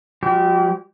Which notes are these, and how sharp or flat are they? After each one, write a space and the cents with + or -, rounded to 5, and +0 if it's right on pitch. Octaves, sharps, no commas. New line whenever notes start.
F3 +35 G#3 -40 G4 -30